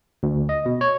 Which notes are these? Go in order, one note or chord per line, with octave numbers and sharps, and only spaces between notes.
D2
D#5
B2
C#5